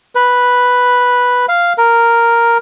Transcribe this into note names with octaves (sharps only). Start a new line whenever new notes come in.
B4
F5
A#4